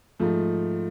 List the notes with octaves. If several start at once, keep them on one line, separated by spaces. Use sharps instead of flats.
G#2 F3 A3